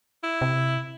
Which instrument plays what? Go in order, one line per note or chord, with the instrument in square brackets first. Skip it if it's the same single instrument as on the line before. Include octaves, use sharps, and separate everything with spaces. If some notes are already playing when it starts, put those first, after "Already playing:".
[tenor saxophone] E4
[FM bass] C3